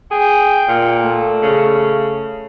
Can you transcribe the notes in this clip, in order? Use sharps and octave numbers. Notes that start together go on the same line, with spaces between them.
G#4 G5
A#2
A3
C#3